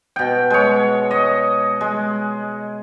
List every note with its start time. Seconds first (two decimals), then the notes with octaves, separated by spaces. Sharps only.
0.16 B2 G5
0.50 G#3 C#5
1.11 D#5
1.81 G#3